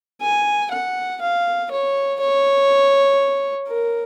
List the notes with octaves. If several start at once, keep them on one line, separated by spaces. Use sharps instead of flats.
G#5
F#5
F5
C#5
C#5
A#4